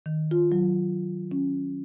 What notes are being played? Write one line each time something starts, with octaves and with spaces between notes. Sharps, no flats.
D#3
F4
F#3
C#4